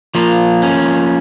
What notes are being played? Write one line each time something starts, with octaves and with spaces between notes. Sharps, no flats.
F3 A#3 F4
C#4